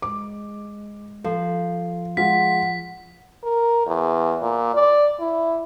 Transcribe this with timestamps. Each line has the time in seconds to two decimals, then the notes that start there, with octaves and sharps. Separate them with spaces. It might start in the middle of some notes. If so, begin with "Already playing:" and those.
0.02 G#3 D6
1.24 F3 A4
2.17 G#3 F4 F#5 B6
3.43 A#4
3.87 E2
4.41 A#2
4.74 D5
5.20 E4